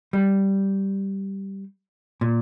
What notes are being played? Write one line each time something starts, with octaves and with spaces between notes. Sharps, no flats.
G3
A#2